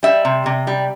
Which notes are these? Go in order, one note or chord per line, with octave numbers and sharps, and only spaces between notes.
G3 E5
C3
C3
G3